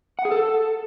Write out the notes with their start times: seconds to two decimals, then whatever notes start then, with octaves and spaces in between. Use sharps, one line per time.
0.19 F#5
0.25 G#4
0.31 A4